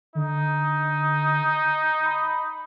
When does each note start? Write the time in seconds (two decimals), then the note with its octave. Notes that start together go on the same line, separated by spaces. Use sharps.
0.15 D3 D#4
2.05 B5